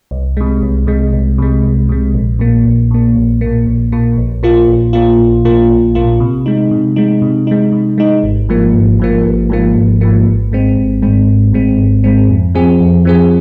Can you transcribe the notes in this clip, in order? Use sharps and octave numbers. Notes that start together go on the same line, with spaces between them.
C2
C3 G#3
C2
C3 G#3
C2
C3 G#3
C2
C3 G#3
A#1
A#2 A#3
A#1
A#2 A#3
A#1
A#2 A#3
A#1
A#2 A#3
A#1
A#2 A#3 F4
A#1
A#2 A#3 F4
A#1
A#2 A#3 F4
A#1
A#2 A#3 F4
C3
G#3 D#4
C3
G#3 D#4
C3
G#3 D#4
C3
G#3 D#4
G#1
G#2 F3 A#3
G#1
G#2 F3 A#3
G#1
G#2 F3 A#3
G#1
G#2 F3 A#3
G#1
G#2 G#3 C4
G#1
G#2 G#3 C4
G#1
G#2 G#3 C4
G#1
G#2 G#3 C4
F2
F3 C4 G#4
F2
F3 C4 G#4